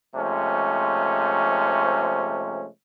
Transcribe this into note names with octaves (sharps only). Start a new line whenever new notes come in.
C3 F3 G#3 A3 C#4